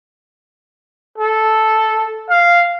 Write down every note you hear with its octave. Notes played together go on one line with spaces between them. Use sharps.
A4
F5